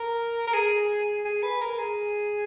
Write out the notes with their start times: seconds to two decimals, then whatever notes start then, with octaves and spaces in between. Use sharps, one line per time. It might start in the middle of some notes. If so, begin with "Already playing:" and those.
Already playing: A#4
0.47 A#4
0.53 G#4
1.25 G#4
1.42 B4
1.61 A#4
1.78 G#4